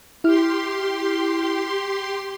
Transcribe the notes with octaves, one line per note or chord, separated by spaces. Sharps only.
E4 G4 C6 F6